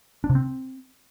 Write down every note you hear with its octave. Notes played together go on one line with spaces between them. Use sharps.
D4
C3
C4